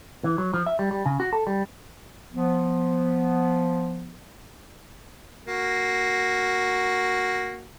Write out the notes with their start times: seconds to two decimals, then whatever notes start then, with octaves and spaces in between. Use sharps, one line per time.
0.24 E3
0.38 F#3
0.54 F3
0.66 E5
0.79 G3
0.91 G3
1.06 C#3
1.20 F#4
1.33 A4
1.47 G3
2.33 F3 B3
5.48 A#3 F#4